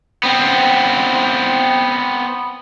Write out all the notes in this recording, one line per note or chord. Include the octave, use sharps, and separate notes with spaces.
B3 C4